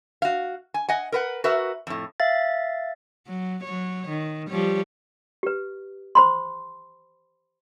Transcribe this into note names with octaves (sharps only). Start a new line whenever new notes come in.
F#4 F5
G#5
D#5 F#5 G#5
A#4 B4 F#5
F#4 A#4 B4 E5
F2 A2
E5 F5 A6
F#3
F#3 C#5
D#3
F3 G3 C#5
G4 B4
C5 B5 C6